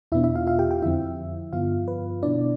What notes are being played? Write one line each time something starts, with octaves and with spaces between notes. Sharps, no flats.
E2 B2 B3 D4 E4 E5
E4 E5
F4 F5
F4 F5
G4 G5
G4 G5
F2 D3 F3 C4 E4 E5
G2 D3 F3 B3 F4 F5
B4
B2 B3 D4 E4 D5